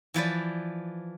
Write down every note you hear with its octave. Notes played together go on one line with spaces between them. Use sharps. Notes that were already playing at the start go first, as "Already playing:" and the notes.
E3 F3 B4 D5